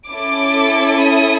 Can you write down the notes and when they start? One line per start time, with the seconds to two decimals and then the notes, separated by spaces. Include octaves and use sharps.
0.10 C#4 E4 A4 D6
1.03 D#6